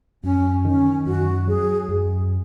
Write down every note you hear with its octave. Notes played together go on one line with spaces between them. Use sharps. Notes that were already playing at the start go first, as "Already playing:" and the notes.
F#2 C#4
D#3 C#4
F#2 F#4
F#3 G#4
F#2